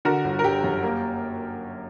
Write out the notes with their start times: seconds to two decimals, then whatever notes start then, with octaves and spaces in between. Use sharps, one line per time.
0.05 D3 F#4 A#4
0.24 G1
0.39 A#4
0.44 G1 G4
0.64 F#2
0.83 A#3